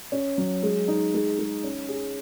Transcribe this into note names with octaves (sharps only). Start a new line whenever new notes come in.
C#4
F#3
G#3
D#4
G#3
G#3
C#4
G#4